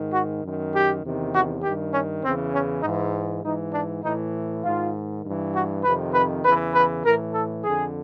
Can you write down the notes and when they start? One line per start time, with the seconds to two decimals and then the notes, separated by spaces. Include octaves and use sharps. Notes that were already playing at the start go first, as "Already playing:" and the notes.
Already playing: G#2 D#3
0.13 F#4
0.43 F#2 D#3
0.72 G4
1.03 E2 C3 D#3
1.33 F#4
1.62 G2 D#3 G4
1.93 C#4
2.23 E2 C#3 E3 C4
2.54 C#4
2.83 G#2 E3 D#4
3.44 G#2 E3 D#4
3.73 D4
4.04 A2 E3 D#4
4.63 G#2 D#3 F4
5.24 G2 E3
5.55 F#4
5.84 F2 C3 D#3 B4
6.14 B4
6.44 E2 C#3 E3 B4
6.74 B4
7.04 A2 E3 A#4
7.34 A4
7.64 F2 D3 G#4